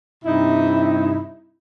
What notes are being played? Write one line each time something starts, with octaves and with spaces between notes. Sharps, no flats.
G2 C3 D#4 E4